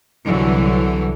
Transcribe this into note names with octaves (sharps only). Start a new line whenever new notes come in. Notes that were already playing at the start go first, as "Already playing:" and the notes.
C2 D3 E3 F#3